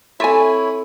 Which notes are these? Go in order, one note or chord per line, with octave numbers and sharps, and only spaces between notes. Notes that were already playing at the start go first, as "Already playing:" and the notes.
C4 E4 A4 C#5 E5 G#5 C6